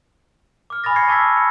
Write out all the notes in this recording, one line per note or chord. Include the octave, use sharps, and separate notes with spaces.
D6 F6
G#5 B5 D#6 A6 A#6
C#6 G#6 A#6 C7 C#7
A5 C#6 D6 E6 G#6 B6
B5 C#7